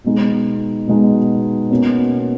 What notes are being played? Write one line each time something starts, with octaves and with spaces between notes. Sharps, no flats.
B2 G#3 D#4
B2 G#3 D#4
B2 A#3 C#4